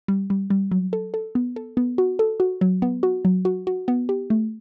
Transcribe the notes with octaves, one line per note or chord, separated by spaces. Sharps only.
G3
G3
G3
F#3
A4
A4
B3
A4
B3
F#4
A4
F#4
F#3
B3
F#4
F#3
F#4
F#4
B3
G4
A3